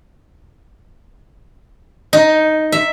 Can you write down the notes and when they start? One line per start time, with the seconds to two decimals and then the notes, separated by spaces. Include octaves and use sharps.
2.13 D#4
2.72 E5